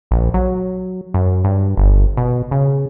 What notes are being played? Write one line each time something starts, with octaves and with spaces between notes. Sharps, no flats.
A#1
F#3
F#2
G2
G1
B2
C#3